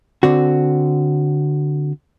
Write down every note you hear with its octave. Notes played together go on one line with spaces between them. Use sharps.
D3 C4 F#4